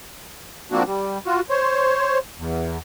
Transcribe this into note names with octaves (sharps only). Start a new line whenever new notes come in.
F3 A#3 C4 D4 F#4
G3
F4 F#4
C5 C#5
E2